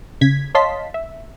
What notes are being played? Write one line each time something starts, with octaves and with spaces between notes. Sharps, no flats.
C#3 G#6 B6
C#5 D#5 F5 A5 C6 B6
E5